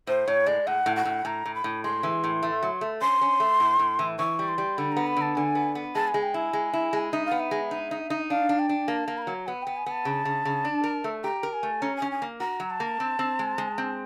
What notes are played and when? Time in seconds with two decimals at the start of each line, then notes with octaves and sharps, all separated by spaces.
0.07 A2 C5
0.28 A2 C#5
0.46 G#3 D5
0.67 A2 F#5
0.86 A2
0.96 F#5
1.05 A2
1.25 A2 A#5
1.45 A2
1.55 B5
1.64 A2
1.83 G#3 C6
2.03 E3
2.24 A2
2.43 A3
2.63 F#3
2.81 A3
3.01 C#4 C6
3.21 C#4
3.40 A3
3.60 A2
3.79 A2
3.99 E3
4.19 E3 C#6
4.39 G3
4.48 C6
4.58 G3
4.78 D3 B5
4.92 B3 A#5
5.07 B5
5.17 D3 A5
5.36 D3 G#5
5.55 B3
5.75 B3
5.95 G#3 A5
6.08 G#5
6.14 G#3
6.22 G5
6.34 E4 G#5
6.53 G#3
6.73 E4
6.93 G#3
7.12 D#4 E5
7.26 F5
7.31 B3
7.40 E5
7.51 G#3
7.71 D#4
7.91 D#4
8.10 D#4
8.30 D4 F5
8.49 D4
8.59 G5
8.69 D4
8.88 A#3 A5
9.08 A#3
9.18 B5
9.22 F#3 A#5
9.47 B3 F#5
9.62 B3 G5
9.77 G#5
9.86 B3 A5
10.05 C#3
10.25 C#3
10.45 C#3
10.65 D4
10.84 A#4
11.04 A3
11.24 G4 A#5
11.43 A#4
11.53 G#5
11.63 A3
11.82 C#4 A#5
11.97 G#5
12.02 C#4
12.11 G#5
12.22 A#3
12.40 F#4 A#5
12.60 F#3
12.70 A5
12.80 A#3
13.00 C4
13.19 C4
13.39 G#3
13.58 G#3
13.78 C4